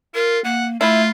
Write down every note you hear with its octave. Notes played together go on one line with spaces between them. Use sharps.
F4 A#4
A#3 F#5
A3 E4 F4